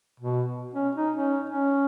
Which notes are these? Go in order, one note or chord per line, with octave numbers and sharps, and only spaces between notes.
B2
C#4
D#4
C#4
C#4